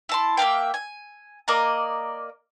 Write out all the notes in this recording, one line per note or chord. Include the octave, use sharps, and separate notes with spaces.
E4 A5 C6
A#3 E5 F5 G5
G#5
A#3 D5 D#5 A#5